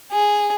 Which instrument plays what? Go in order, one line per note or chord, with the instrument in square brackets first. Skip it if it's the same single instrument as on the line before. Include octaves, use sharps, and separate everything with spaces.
[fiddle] G#4